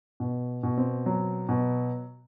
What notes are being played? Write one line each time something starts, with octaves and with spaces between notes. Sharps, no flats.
B2
B2
C4
F#3
B2